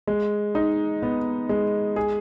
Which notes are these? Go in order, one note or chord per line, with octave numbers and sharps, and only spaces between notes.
G#3
D#4
B3
G#3
G#4